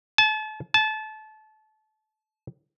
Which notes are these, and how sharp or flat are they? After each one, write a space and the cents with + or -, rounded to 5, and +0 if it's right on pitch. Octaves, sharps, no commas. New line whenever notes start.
A5 -35
A5 -25